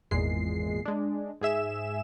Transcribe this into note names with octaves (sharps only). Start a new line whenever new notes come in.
G#1 E2 A#2 G#3 C7
G#3 D4
G#2 G#4 E5 E7